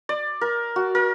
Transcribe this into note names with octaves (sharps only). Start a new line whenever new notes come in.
D5
A#4
F#4
A#4